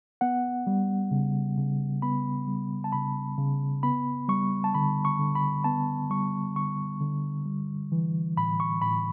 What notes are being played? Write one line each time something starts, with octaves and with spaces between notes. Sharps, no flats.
B3 F#5
G3
C#3
C#3
B3 B5
G3
A5
C#3 B5
C#3
B3 B5
G3 C#6
A5
D3 B5
C#6
D3
B5
B3 A5
G3 C#6
D3 C#6
D3
G3
E3
A2 B5
C#6
A2 B5